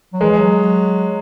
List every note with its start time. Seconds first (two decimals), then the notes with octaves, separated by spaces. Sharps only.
0.13 F#3
0.21 E3 G#3
0.37 F#3